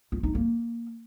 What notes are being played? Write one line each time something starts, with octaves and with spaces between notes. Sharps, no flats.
F4
D#4
A#3